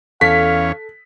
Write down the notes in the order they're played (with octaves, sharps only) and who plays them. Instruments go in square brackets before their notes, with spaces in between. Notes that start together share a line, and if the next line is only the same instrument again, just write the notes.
[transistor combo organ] E2 C#4 [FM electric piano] A4 [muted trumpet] F5 [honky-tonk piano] B6